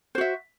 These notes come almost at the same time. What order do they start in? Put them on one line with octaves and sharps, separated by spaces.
C5 F#4 E5